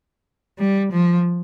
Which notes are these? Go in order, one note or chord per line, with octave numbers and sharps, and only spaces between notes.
G3
F3